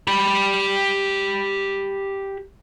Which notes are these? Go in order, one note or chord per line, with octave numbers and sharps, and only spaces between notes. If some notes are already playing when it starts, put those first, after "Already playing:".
G4 B5